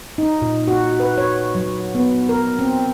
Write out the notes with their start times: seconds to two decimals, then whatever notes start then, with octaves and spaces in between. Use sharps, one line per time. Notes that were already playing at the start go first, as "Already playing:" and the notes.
0.18 D#4
0.42 A#2
0.68 F#4
1.00 B4
1.18 C#5
1.55 F#3
1.95 B3
2.29 A#4
2.59 C4